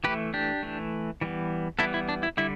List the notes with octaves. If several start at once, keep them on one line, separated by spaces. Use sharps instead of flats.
E3 A3 G4 B4
D4 G4
E3 A3
E3 G3 B3
E3 G3 B3 E4 A4
E4
D4
E4
D3 G3 E4